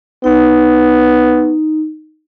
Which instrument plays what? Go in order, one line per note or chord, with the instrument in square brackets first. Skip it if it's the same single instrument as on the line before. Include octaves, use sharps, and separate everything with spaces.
[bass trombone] B3 [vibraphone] D#4